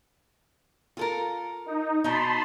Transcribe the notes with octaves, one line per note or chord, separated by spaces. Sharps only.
F4 A4 A#4
D#4
B2 D#4 A5 B5 C6